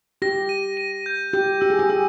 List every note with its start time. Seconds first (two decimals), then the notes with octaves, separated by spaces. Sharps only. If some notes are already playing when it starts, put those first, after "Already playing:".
0.22 G4 A#6
0.49 D#7
0.77 D#7
1.06 G6
1.33 G4 G6
1.61 G4 E6
1.70 G#4
1.79 G4
1.90 G#4 E6